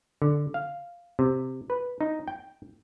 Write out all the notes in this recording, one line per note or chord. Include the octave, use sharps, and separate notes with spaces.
D3
F5
C3
B4
D#4
G5